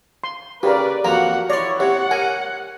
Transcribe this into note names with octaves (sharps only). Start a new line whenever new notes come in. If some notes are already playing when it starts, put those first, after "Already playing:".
C6
C#3 G4 A#4 B4 D5
F2 F3 A#3 F#4 F#5 A#5
E4 C#5 D5 A#5 C6
C3 C#5 F#5
A#4 G#5